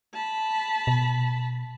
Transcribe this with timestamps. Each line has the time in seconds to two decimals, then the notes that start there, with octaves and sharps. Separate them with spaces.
0.14 A5 B5
0.87 B2